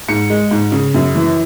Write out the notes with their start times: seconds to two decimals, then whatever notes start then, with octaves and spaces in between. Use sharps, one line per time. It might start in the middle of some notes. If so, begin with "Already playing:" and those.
0.08 G#2 C#7
0.30 G#3
0.51 G#2
0.72 C#3
0.94 F#2
1.15 E3